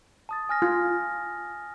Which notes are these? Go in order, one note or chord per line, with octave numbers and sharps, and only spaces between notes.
A5 D#6 A6
G#5 F6 A#6
F4